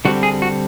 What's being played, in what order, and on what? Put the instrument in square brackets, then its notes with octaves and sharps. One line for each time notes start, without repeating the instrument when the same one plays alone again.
[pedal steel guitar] D3 G3 C4 F#4
G#4
F#4